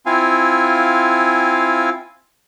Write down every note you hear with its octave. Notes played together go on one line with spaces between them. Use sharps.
C4 E4 F4 F5 G#5